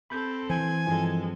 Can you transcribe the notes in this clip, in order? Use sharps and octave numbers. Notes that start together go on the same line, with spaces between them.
C4 A4 B5 G6
E3 C5 G#5
G2 F3 G#3 C4 A4